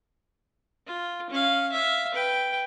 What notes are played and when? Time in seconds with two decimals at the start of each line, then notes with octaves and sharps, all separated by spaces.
0.87 F4
1.30 C#4 F5
1.72 E5 F5
2.14 B4 G5